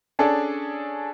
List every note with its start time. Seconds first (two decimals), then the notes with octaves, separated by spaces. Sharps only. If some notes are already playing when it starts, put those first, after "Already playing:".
0.19 C#4 D4 G#4 A4 D5